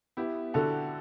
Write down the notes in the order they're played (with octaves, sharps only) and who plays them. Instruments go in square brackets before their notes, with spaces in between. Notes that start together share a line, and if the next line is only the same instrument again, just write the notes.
[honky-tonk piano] B3 [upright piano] E4 G4
[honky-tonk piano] D3 [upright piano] F#4 A4